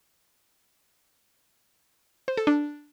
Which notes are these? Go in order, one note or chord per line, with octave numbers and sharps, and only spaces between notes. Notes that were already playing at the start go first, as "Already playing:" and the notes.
C5
A4
D4